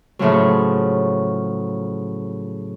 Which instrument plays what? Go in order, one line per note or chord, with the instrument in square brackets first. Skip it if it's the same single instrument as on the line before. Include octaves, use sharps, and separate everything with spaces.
[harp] A2 C#3 F3 F#3